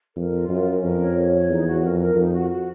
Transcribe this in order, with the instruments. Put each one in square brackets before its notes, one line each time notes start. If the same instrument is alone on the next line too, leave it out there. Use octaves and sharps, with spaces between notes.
[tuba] F2 [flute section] A#4
[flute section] F4
[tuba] F#2 [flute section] A#4
[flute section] C#4
[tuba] F2 [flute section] A#4
[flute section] C#5
C#5
C#5
[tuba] E2 [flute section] D#4
[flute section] F#4
[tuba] F2 [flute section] A#4
[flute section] A#4
[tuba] F2 [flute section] D#4
[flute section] F#4
F#4